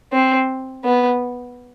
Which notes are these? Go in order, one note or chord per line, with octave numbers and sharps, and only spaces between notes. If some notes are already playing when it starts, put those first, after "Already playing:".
C4
B3